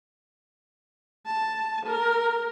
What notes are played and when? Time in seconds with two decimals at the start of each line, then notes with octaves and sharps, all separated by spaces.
1.26 A5
1.86 A#4